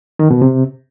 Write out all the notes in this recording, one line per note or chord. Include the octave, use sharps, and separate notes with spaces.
D#3
B2
C3